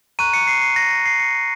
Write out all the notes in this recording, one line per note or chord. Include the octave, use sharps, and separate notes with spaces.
A#5 C#6 F#6 D#7
C#7
C7
C7
A#6
A#6
C7
C#7